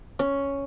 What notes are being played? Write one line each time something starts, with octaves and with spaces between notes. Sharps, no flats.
C#4